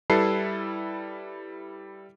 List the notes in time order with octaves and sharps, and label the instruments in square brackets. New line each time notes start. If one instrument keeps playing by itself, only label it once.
[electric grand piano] G3 E4 A4 B4 C7